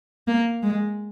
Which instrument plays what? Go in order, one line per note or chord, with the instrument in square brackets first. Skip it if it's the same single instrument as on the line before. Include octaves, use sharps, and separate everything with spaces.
[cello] A#3
G#3